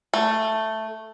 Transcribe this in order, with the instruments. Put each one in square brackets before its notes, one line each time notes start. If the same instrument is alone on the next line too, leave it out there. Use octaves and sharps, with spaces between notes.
[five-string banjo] A3